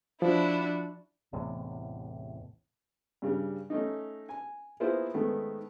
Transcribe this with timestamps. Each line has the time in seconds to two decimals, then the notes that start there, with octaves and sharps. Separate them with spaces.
0.22 F3 D4 E4 F#4
1.33 A1 E2 A2 C3
3.22 G2 C#3 G3
3.70 A3 C#4 D#4
4.29 G#5
4.80 A#3 B3 E4 F4 G#4 C5
5.14 G#2 D#3 A3 B3